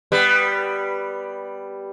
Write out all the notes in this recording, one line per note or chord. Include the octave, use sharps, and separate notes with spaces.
G3 B3